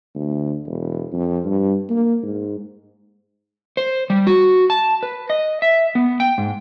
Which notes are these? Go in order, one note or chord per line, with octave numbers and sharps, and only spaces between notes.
D2
E1
F2
G2
A#3
G#2
C5
G3
F#4
A5
B4
D#5
E5
B3
G5
G#2